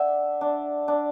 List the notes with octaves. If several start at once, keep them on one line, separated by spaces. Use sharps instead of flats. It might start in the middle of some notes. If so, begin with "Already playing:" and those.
Already playing: D4 D5 E5 F#5
D4
D4